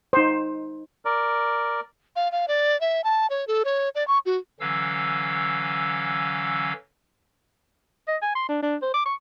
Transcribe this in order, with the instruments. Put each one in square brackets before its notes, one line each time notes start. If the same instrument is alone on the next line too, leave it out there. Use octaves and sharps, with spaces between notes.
[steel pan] D#4 C5
[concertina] A#4 D5
[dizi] F5
F5
D5
E5
A5
C#5
A4
C#5
D5
C#6
F#4
[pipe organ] D3 E3 F#3 C#4 F5 E6
[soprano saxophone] D#5
G#5
C6
D4
D4
C5
D6
C#6